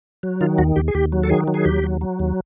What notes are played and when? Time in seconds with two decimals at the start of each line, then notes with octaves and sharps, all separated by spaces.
0.23 F#3
0.41 D#3 F4
0.58 D#2 F#4
0.76 D#2 G4
0.88 G#4
0.94 D#2 G4
1.12 F#3
1.23 A4
1.30 D#3 G#4
1.48 F#3
1.54 G#4
1.65 D#2 G4
1.84 F#3
2.01 F#3
2.19 D#2